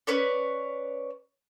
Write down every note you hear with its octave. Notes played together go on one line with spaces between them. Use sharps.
C#4 B4 C#5 D5